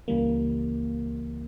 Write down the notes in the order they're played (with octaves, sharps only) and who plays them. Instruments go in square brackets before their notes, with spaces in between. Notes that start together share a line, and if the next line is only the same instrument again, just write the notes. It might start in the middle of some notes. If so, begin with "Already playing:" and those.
[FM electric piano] C#2 C#3 E3 G3 A#3